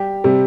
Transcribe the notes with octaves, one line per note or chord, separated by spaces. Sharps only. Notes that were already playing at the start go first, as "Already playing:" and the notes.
Already playing: G3 G4
C3 G3